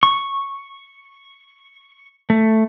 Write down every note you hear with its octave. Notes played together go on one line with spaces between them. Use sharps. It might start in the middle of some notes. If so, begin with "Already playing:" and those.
C#6
A3